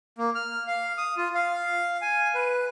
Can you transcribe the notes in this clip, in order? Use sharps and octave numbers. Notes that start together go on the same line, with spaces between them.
A#3
F6
F5
D#6
F4
F5
G#5
B4